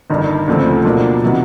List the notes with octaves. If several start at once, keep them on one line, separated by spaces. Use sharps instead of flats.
G1 G2 D#3
D2 C#3 F3 A3 C4
B2 F#3 A#3 D4 F4
C3 D#3 F#3 B3